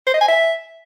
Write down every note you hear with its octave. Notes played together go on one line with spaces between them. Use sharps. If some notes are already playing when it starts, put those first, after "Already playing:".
C5
D#5
G#5
E5